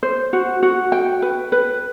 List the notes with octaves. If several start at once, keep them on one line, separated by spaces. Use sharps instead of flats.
C5
F#4
F#4
G5
B4
B4